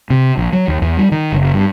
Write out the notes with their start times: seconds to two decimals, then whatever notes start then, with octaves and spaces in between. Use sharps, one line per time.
0.10 C3
0.37 A#1
0.53 F#3
0.68 D#2
0.82 E2
0.97 G3
1.12 D#3
1.32 F#1
1.54 G2